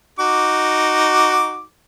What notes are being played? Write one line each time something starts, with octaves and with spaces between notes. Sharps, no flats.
D#4 F#4 D6